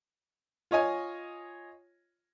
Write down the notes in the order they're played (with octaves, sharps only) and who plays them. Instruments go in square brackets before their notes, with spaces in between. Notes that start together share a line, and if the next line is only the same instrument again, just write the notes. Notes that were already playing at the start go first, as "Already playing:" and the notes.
[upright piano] F4 C#5 D#5 G#5